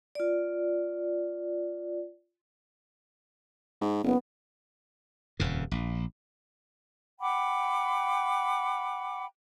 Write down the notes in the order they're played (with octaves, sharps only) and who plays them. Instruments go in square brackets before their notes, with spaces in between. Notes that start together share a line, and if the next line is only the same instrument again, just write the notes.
[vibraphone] F4 D5
[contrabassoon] G#2
[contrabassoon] F#1 [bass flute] B3
[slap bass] D#1 F2 C#3
A#1
[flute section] F#5 G5 B5 D6